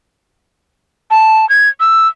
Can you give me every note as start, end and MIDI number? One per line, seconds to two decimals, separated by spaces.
1.11 1.48 81
1.49 1.69 92
1.80 2.08 88